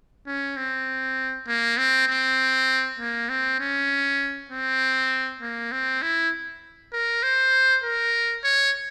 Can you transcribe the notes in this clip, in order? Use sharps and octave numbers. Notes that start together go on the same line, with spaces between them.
C#4
C4
A#3
C4
C4
A#3
C4
C#4
C4
A#3
C4
E4
A#4
C5
A#4
C#5